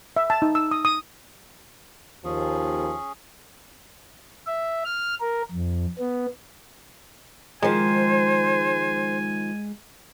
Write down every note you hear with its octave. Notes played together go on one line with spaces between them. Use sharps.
E5
A5
D#4
E6
D#6
D#6
D#2 F3 C#4 G#4
E5
F6
A#4
F2
B3
D#3 F3 G#3 C5 G#5